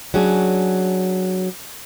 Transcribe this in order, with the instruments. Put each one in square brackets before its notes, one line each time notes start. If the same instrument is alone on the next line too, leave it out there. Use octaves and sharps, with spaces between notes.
[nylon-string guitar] F#3 C#4 D4 G#4